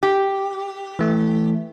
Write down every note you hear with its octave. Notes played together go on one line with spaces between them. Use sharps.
G4
E3 A3